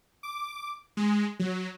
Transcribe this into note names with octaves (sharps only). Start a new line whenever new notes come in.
D6
G#3
F#3